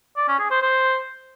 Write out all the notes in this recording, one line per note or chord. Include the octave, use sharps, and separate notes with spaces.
D5
C#4
G#4
C5
C5